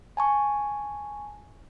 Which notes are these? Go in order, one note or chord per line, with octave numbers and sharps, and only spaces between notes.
G#5 A5 C#6